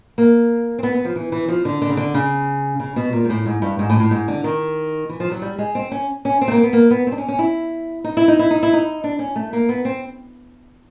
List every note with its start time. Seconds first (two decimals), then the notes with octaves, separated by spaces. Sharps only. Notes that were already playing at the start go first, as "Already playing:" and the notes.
0.18 A#3
0.79 C4
0.83 B3
0.94 B3
1.05 F3
1.16 E3
1.32 E3
1.48 F3
1.65 D3
1.82 D3
1.90 C#3
1.97 D3
2.14 C#3
2.80 C#3
2.96 B2
3.13 A#2
3.25 G#2
3.30 A2
3.46 G#2
3.62 G2
3.79 G#2
3.90 A2
4.00 A2
4.11 G#2
4.28 D3
4.44 D#3
5.09 E3
5.20 F3
5.32 F#3
5.42 G3
5.58 G#3
5.75 C4
5.92 C#4
6.25 C#4
6.41 C4
6.48 A3
6.51 A#3
6.63 B3
6.73 A#3
6.91 B3
7.07 C4
7.12 D4
7.18 C#4
7.28 C#4
7.39 E4
8.04 D#4
8.17 E4
8.28 D#4
8.39 E4
8.51 D#4
8.63 E4
8.73 D#4
9.04 D4
9.19 C#4
9.36 A3
9.53 A#3
9.69 B3
9.85 C4